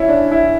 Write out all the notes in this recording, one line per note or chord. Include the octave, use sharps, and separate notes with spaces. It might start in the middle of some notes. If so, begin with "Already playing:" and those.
Already playing: C#4 E4
D4
E4